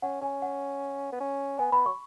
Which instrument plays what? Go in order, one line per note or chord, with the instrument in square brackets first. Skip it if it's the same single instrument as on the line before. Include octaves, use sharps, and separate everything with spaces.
[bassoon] C#4 [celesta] F#5
[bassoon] C#4 [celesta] G#5
[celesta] F#5
[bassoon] B3
C#4
[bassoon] B3 [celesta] G#5
[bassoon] B3 [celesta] B5
[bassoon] F#3 [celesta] C#6